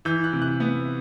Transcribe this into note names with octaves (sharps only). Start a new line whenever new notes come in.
E3 G6
F#6
C3
F#6
B3